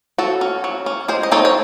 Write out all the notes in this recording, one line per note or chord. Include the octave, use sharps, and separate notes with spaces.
F#3 F#4 A4
C#4
F#3
C#4
G#3 G#4 C5
D#5
C4 D#4 A4 C#5
C#5